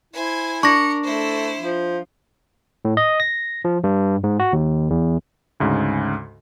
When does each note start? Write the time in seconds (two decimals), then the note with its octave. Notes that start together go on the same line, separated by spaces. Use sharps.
0.13 E4 C5 G#5
0.63 D4 A#4 C#6 A#6 C#7
1.04 A3 E4 C5
1.58 F3
2.85 A2
2.97 D#5
3.20 A#6
3.65 F3
3.84 G2
4.24 G#2
4.40 F#4
4.53 D#2
4.90 E2
5.60 D2 G#2 C#3